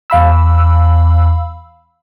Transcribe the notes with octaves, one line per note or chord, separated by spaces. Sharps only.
E2 F5 B5 E6